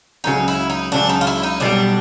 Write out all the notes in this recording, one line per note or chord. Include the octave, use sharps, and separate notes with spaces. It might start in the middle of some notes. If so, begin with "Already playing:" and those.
C#2 C#3 F#3 D#4
E4
D#4
C#2 C#3 F#3 D4
D#4
F4
E4
D#4
B1 B2 G3 D4